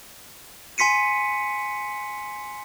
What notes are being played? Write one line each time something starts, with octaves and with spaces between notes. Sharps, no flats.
G#5 C6 B6 C#7 D#7